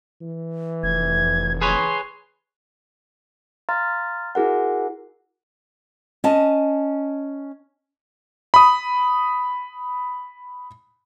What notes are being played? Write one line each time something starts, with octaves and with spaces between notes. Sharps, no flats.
E3
F1 G#6
G#4 B4 C#5 C6
F5 A#5 C6 F6 A6
E4 F#4 G#4 A#4 F#5
C#4 D#5 A5
B5 D#6